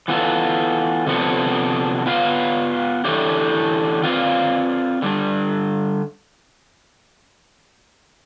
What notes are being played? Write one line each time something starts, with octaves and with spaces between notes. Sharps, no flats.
E3 B3 F4 A4
C3 F3 B3 D4 A4
B3 F4 B4 F5
A2 E3 A3 D4 G4
C4 F4 B4 D5 F5
D3 G3 D4